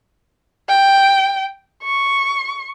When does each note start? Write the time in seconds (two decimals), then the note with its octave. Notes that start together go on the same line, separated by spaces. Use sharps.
0.69 G5
1.83 C#6